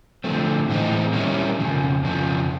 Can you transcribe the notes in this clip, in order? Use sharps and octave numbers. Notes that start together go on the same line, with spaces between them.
D3 F3 A3 C4
A2 E3 G#3 C4 D#4
D#3 G3 A#3 C#4 E4
F2 C#3 F3
F2 C#3 F3